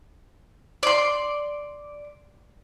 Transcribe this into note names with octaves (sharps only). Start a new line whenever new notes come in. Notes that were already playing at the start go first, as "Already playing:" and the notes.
D5 C6